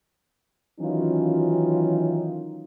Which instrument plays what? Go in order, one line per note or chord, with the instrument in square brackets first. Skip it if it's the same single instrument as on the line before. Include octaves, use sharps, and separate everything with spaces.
[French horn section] D#3 E3 F#3 C#4 D#4 F4